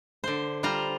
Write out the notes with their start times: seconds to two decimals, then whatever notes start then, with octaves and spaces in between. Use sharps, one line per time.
0.24 D3 C5
0.63 G3 F4 C5 A#5